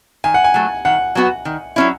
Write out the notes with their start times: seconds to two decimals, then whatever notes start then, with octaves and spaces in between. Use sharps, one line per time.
0.24 D#3 G#5
0.34 F#5
0.44 G#5
0.54 F#3 A3
0.85 D#3 F#5
1.15 F#3 B3 F#4
1.45 D#3
1.76 F#3 C#4 E4